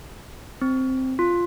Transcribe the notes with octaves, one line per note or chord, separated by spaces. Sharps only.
C4
F4